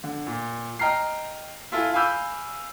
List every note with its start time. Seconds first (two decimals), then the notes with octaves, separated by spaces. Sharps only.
0.04 D3
0.26 A#2
0.79 D#5 G5 A#5 F6 C7
1.72 E4 F4 A4 G#5
1.94 F5 G#5 B5 D6 E6 G6